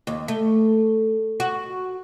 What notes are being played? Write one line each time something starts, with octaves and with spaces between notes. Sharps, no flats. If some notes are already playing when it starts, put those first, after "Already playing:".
D#2
A3
F#4